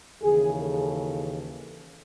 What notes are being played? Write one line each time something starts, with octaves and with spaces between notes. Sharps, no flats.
D#2 C#3 E3 G#4
A4